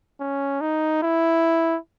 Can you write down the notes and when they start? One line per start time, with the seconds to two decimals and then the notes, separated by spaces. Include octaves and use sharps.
0.20 C#4
0.61 D#4
1.03 E4